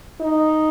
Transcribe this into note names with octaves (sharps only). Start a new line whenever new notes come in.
D#4